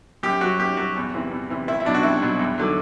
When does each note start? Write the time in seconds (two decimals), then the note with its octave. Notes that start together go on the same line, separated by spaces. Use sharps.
0.23 F#2 G4
0.41 F#3 F#4
0.60 F#2 G4
0.77 F#3 F#4
0.96 E2
1.14 C3 E3
1.31 E2
1.50 C3 E3
1.68 C2 E4
1.80 E4
1.85 B2 F#3 D4
1.94 F#4
2.03 C2 E4
2.22 B2 F#3
2.39 E2
2.58 D3 F#3